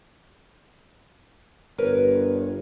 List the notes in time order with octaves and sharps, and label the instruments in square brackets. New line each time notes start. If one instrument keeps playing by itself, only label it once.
[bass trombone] G1 [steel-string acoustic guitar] A#4 B4 C#5